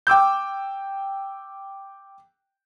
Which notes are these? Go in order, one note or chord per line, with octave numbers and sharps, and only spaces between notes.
G5 D6 E6 G6